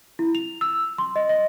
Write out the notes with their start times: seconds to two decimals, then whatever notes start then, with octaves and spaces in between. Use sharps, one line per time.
0.19 E4
0.35 F7
0.61 E6
0.98 C6
1.16 D#5
1.29 D#5